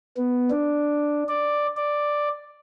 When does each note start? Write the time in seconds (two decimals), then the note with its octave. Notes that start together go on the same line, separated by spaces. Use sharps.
0.17 B3
0.50 D4
1.28 D5
1.76 D5